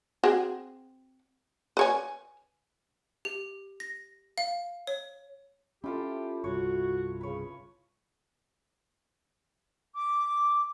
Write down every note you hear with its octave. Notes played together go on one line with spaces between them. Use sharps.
C4 F#4 G#4
B4 C#5 G#5
G4
A#6
F5
C#5
C#4 E4 F4 G4 A4
G1 C2 F#4 C#5
C#3 B4 C#5
D6